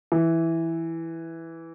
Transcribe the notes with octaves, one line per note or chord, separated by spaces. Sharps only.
E3